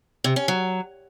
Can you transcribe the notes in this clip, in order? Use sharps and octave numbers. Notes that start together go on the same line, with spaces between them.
C3
C#4
F#3